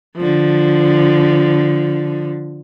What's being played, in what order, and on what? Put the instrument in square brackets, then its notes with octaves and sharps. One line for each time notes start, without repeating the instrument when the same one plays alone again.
[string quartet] D3 F3